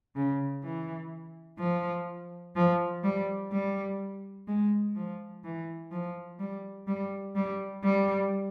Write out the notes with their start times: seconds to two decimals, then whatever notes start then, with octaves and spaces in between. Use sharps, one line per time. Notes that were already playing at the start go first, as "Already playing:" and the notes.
0.16 C#3
0.64 E3
1.59 F3
2.56 F3
3.03 G3
3.52 G3
4.48 G#3
4.96 F3
5.44 E3
5.92 F3
6.39 G3
6.87 G3
7.36 G3
7.84 G3